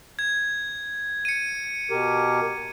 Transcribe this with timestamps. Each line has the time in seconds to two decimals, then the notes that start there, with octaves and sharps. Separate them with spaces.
0.19 G#6
1.25 C#7 D#7
1.91 B2 G4 A#4